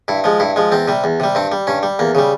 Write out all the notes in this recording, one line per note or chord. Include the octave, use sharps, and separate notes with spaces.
G2 E4
F3 G#3
G2 E4
F3 G#3
E2 C4
C3 G3
E2
C3 G3
G2 C4
G3
G2 C#4
G3
E2 A#3
C#3 G3